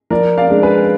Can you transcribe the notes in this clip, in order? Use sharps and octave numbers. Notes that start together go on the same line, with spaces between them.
F3 A#4 D5
D5 F5
G#3 D4
G#4 B4